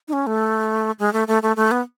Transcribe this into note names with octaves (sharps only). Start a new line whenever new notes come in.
D#4
C#4
A3
G#3
A3
A3
A3
A3
B3